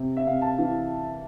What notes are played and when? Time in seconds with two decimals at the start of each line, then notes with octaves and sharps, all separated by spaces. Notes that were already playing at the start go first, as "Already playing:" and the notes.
Already playing: C3
0.17 E5
0.26 C3 F5
0.42 A5
0.58 E3 F5